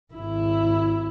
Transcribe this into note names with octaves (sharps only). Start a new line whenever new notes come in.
G#1 E4